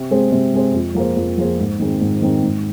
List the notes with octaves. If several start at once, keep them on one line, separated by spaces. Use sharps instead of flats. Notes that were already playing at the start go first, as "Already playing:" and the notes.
Already playing: C3
G#3 C4 G#4 C5
C3
G#3 C4 G#4 C5
F2
F3 A#3 G#4 C5
F2
F3 A#3 G#4 C5
G#2
D#3 C4 G#4
G#2
D#3 C4 G#4
G#2